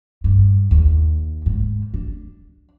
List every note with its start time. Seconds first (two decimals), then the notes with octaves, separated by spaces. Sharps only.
0.24 G2
0.71 D#2
1.46 G#2
1.94 D4